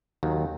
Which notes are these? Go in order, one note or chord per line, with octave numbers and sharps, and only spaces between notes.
D#2 D#3 F#3